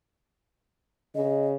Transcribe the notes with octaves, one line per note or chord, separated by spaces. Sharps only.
C#3 D#5